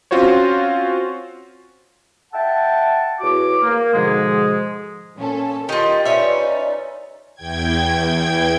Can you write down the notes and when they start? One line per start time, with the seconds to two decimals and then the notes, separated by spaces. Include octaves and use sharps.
0.11 C4 C#4 F4 F#4 C5 C#5
2.33 E5 F#5 G5 A5
3.20 E2 F#4 C#5 D6
3.62 A#3
3.94 G#2 B2 D3 F3 G#3
5.16 A#2 C#4 A4
5.69 D#3 D#4 F4 G4 D#5 G5
6.05 C#4 D#4 B4 C#5 D5 E5
7.35 E2 G5 G#6